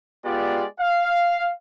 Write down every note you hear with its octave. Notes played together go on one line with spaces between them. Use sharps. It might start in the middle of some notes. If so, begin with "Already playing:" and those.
G#3 B3 F4 G4 D5
F5